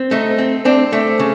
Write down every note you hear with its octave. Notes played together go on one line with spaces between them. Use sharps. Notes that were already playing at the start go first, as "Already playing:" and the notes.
Already playing: C4
A3 D#4
C4
C4 D4
A3
C#3